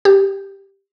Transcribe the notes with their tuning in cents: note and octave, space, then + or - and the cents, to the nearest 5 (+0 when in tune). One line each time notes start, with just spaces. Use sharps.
G4 +0